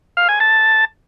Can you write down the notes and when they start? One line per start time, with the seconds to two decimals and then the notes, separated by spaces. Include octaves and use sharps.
0.17 F5
0.29 G#5
0.40 A5